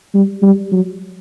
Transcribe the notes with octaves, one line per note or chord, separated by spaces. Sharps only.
G3
G3
F#3